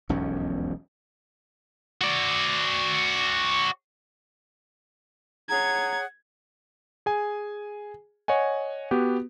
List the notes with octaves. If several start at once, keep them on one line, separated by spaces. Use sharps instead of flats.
E1 B1 F2 C#4
F#4 D5
G#4 C#5 F#5 A#5 G#6
G#4 G#5
C#5 D#5 F#5 G#5
B3 F#4 G4